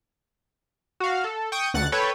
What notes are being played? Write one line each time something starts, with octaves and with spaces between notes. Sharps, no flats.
F#4 F5
A4
G5 C#6 D#6
D2 F#5 F#6 A6
A4 B4 C#5 G5